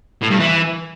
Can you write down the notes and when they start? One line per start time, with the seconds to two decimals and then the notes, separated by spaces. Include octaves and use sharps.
0.22 A2
0.31 G2
0.40 E3